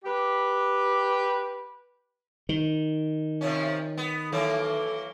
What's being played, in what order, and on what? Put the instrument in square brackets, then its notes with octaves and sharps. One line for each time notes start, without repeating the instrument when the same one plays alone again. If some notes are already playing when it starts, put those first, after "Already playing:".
[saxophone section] G4 B4
[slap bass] D#3
[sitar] C3 F3 C#4
B3
[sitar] E3 F#3 A#3 [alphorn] A4